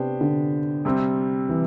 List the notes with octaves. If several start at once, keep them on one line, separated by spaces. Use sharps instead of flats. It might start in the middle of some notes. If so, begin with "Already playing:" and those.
Already playing: C3 B3 D4 G4 C5
D3
C3 G3 C4
E3